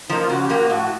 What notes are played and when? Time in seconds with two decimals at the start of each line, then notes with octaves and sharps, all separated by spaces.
0.10 F3 A#3 D#4
0.20 F4
0.30 C#3 F#4
0.43 G4
0.50 F3 A#3
0.57 F#4
0.70 A2 F#4